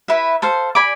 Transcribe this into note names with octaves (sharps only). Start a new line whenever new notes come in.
E4 B4 E5 B5
A4 C5 F5
D5 G#5 B5 D6